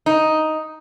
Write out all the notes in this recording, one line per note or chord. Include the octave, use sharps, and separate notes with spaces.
D#4